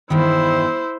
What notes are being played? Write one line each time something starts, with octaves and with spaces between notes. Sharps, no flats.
E2 G2 D#3 E4 C5